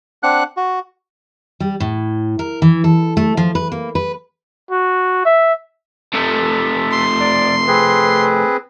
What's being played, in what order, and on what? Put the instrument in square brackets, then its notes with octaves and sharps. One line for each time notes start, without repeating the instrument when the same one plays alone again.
[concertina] C4 D4 F#5 F#6
F#4
[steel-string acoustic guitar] G3
A2
A#4
E3
A4
A3
F3
B4
A#3
B4
[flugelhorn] F#4
E5
[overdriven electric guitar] C3 A3 [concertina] A4 E5
[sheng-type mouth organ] C6
[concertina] D5
C4 G#4 B4